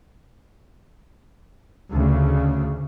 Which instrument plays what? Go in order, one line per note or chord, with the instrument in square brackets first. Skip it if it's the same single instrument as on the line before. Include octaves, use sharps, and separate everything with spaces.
[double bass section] D2 C#3